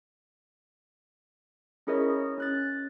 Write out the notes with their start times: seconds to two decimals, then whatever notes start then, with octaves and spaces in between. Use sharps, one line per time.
1.87 C#4 E4 G#4 A#4 C#5 D#5
2.38 C#4 F#6 A6